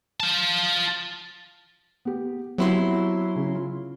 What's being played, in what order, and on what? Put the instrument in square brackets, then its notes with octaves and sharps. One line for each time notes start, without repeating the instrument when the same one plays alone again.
[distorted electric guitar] F4 A5
[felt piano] B3 G4
[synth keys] F#3 E4 C6 [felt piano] B3 C4 G4
[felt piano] C#3
F4